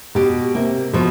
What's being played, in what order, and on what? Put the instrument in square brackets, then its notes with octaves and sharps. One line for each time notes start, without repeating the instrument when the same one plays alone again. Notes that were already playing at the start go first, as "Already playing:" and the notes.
[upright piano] B2 [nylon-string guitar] G4
[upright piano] C3 [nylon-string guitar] A#3
[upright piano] B2 [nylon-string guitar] F3